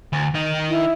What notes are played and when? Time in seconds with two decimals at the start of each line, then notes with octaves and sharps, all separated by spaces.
0.13 D2
0.35 D#3 D#4
0.69 E4